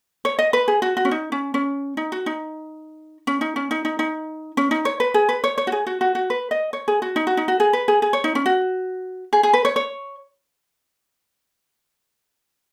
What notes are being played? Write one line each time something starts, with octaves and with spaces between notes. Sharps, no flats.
C#5
D#5
B4
G#4
F#4
F#4
C#4
D#4
C#4
C#4
D#4
F#4
D#4
C#4
D#4
C#4
D#4
D#4
D#4
C#4
D#4
C#5
B4
G#4
B4
C#5
C#5
F#4
G#4
F#4
F#4
F#4
B4
D#5
C#5
G#4
F#4
D#4
F#4
D#4
F#4
G#4
B4
G#4
G#4
C#5
D#4
C#4
F#4
G#4
G#4
B4
C#5
C#5